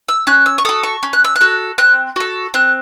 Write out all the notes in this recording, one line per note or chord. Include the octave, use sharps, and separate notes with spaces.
E6
C#4 F#6
E6
C#6
F#4 A4 D#6
C#6
C#4
F#6
E6
F#6
F#4 A4
C4 F#6
F#4 A4
C4 F#6